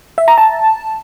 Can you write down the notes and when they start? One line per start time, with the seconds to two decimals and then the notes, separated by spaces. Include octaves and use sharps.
0.18 E5
0.28 A#5
0.38 A5